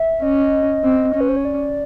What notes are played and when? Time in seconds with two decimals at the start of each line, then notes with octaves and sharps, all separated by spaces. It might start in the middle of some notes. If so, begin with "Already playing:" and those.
Already playing: E5
0.23 C#4 D#5
0.84 C4
1.15 C#4
1.21 B4
1.29 C5
1.37 C#5
1.45 D5